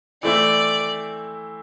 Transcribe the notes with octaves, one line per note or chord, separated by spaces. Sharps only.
E3 A3 C4 E4 D5